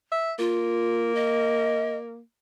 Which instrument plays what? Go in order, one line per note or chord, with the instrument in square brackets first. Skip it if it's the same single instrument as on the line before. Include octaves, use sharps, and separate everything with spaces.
[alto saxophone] E5
[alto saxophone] A#3 [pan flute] F4
[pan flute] D#5